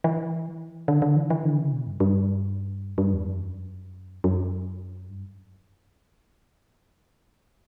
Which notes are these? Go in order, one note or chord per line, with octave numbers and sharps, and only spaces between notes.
E3
D3
D3
E3
E3
D3
C#3
B2
G2
G2
G2
E2
F#2
F#2
G2